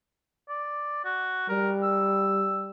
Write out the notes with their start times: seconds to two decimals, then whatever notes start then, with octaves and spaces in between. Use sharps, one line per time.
0.49 D5
1.05 F#4
1.49 G3 A#4
1.83 E6